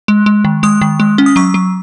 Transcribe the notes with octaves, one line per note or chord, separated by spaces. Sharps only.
G#3
G#3
D#3
G#3 D#6
D#3
G#3
C#4
D#6
F#3 C#6
F#3